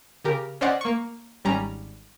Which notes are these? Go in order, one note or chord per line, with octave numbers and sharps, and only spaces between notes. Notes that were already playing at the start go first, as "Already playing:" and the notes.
C#3 G4 A#4
C#4 C5 D5 D#5 F#5
A#3 C#6
G#1 G3 C#4 A#5